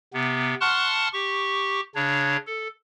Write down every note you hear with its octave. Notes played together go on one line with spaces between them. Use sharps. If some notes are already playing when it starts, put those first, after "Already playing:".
C3 B3
F#5 A5 C6 C#6 F6 F#6
G4 C#6
C#3 D4 C#5
A4